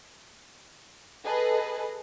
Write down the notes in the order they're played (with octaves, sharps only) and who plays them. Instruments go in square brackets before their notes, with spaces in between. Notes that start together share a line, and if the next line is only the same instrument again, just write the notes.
[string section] G#4 A4 B4 D#5